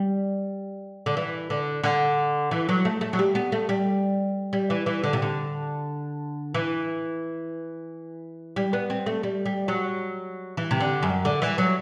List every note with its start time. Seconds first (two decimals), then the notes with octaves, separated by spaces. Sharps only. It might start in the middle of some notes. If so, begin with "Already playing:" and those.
Already playing: G3
1.06 D3
1.17 E3
1.50 D3
1.84 D3
2.51 E3
2.69 F#3
2.85 A3
3.01 A3
3.13 F#3
3.19 G3
3.35 B3
3.52 A3
3.69 G3
4.53 G3
4.70 E3
4.86 E3
5.04 D3
5.13 C3
5.22 D3
6.54 E3
8.56 G3
8.73 B3
8.90 C4
9.06 A3
9.23 G3
9.46 G3
9.68 F#3
10.57 E3
10.71 C3
10.80 D3
11.03 F#2
11.25 D3
11.42 E3
11.58 F#3